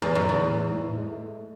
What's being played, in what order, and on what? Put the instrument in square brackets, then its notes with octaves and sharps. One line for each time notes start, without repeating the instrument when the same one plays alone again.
[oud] E2 [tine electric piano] A3
[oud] F#2 [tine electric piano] A3
[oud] E2 [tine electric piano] D3
[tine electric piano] A2
A2
G#2
A2
G#3
A3